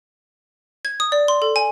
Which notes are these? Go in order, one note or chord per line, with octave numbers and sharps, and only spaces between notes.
G#6
D#6
D5
C6
A4
G#5